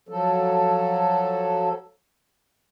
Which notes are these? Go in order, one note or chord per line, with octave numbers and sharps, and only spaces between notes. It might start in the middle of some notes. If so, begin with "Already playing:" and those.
F3 F#3 A4